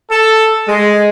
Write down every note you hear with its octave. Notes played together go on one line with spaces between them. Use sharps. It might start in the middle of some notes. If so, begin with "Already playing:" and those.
A4
G#3